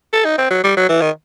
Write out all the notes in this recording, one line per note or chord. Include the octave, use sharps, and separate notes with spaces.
A4
D#4
C4
F#3
G3
F#3
E3
D#3